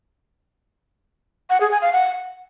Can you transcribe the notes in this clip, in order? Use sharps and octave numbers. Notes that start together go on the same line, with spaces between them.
F#5
G#4
G#5
F5
F#5